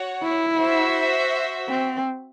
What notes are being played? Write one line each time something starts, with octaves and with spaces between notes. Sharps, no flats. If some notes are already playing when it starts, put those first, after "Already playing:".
Already playing: F#4 C#5 F#5
E4
F#4 C5 E5
C4